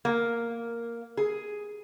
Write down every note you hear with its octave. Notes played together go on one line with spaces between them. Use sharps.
A#3
G#4